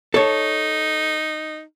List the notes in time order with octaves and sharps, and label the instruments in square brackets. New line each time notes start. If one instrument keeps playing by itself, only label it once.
[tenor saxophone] D#4 [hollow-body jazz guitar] A4 C#5